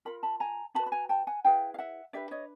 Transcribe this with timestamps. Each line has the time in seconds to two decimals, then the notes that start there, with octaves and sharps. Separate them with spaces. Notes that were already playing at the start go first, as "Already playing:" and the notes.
0.05 F4 A#4 B5
0.23 A5 B5
0.40 G#5 A#5
0.74 D4 F#4 B4 A5 B5
0.86 B5
0.92 G#5 A#5
1.09 G5 A5
1.27 F#5 G#5
1.45 E4 G#4 B4 F5 G5
1.74 F5
1.78 E5 F#5
2.13 D4 G4 B4 D5 E5
2.31 C#5 D#5